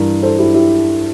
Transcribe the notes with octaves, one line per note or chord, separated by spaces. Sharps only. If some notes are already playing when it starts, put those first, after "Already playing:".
Already playing: G2 E3 A#4
A4 C5
E4 G4
E4 G4